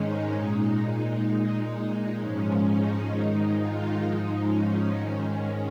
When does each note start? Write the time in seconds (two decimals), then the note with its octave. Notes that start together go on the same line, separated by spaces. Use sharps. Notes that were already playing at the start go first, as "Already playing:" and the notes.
Already playing: G#2 D#3 G#3 C#4 D#4
0.33 A#2 G#3
0.79 D#4
1.25 A#2 G#3
1.70 D#4
2.16 G#2 F3 G#3 C#4
2.62 D#4
3.08 G#2 D#3 G#3
3.54 F4
4.00 G#2 F3 G#3 D#4
4.46 C#4
4.92 G#2 D#3 G#3